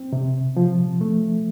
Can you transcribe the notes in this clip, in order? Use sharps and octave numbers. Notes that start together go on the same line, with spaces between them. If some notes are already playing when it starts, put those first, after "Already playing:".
Already playing: C4
C3
F3
A3